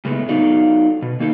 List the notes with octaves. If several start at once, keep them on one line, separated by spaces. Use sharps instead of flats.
A2 C#3 G#3 A3 B3
F#3 B3 D#4 F4 A4 D5
B2
D#3 A#3 D#4 A4